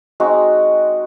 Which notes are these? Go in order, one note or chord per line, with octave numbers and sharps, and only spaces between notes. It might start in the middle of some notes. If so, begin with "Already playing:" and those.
G#3 C4 D#4 F#4